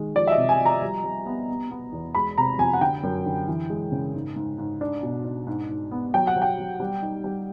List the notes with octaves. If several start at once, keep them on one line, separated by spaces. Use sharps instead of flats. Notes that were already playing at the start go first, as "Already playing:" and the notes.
Already playing: D#3 G#3
F3 D5
E5
D#5
C3
G#5
F3
A#5
G3
G3
B3
B3
B3
E2
G#3 B5
C3 A#5
F2 G#5
F#5
D3 G5
F#2
D3
E3
G#3
C#3
G#2
G#2
G#2
D4
B2
D4
G#2
G#2
B3
F#3 G5
F#5
F#3
G5
F#3
G3
D#4
G3